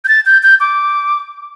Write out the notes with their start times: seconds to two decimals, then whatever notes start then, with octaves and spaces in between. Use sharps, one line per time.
0.05 G6
0.08 A6
0.26 G6
0.43 G6
0.60 D6